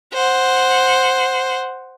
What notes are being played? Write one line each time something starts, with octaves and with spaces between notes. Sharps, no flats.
C5 F#5